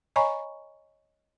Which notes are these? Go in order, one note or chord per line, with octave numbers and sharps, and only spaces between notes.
C#5 D#5 G#5 A#5 B5 C#6